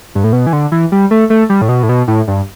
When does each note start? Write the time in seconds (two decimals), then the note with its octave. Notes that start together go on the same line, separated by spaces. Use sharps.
0.15 G2
0.24 A2
0.33 B2
0.47 E3
0.53 D3
0.72 E3
0.92 G3
1.11 A3
1.30 A3
1.49 G3
1.62 A2
1.69 B2
1.83 A2
1.89 B2
2.08 A2
2.28 G2